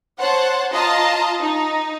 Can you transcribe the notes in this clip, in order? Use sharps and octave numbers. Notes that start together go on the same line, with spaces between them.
C5 C#5 F#5 A5
F4 D#5 A5 A#5
D#4